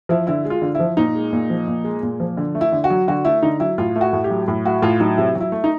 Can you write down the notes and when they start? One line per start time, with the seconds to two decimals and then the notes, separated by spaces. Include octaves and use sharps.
0.09 F3 E4
0.27 D3 E4
0.45 G#3
0.50 F4
0.62 D3
0.75 E4
0.80 F3
0.97 A#2 D#4
1.15 G#3
1.33 A#2
1.50 F3
1.68 A#2
1.84 G#3
2.03 A#2
2.20 F3
2.37 D3
2.55 A3
2.61 E4
2.72 D3
2.84 F#4
2.90 F#3
3.08 D3 F#4
3.25 A3 E4
3.42 D3 D#4
3.60 F#3 E4
3.78 A2 F4
3.96 A3
4.01 F#4
4.13 A2
4.24 G4
4.30 F#3
4.48 A2
4.65 A3 F#4
4.82 A2 F4
5.00 F#3 D#4
5.18 C3 E4
5.35 F#3
5.40 E4
5.52 A3
5.64 D#4